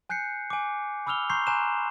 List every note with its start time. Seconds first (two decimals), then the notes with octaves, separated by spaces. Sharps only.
0.09 G#5 F#6 G6 C7 C#7
0.50 G#5 D6
1.07 B5 D6 E6 F6 F7 G7
1.30 A#5 C6 C#6 G6 C7
1.47 G#5 A#5 C6 D6 F#6 E7